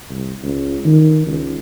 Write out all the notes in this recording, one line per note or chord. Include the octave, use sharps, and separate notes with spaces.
C2
C#2
D#3
C#2